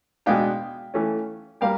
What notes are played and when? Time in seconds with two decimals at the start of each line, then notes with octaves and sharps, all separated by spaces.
0.26 B2 G#3 B3 D4 F5 G5
0.94 E3 A3 C#4
1.61 G3 A#3 F5 G5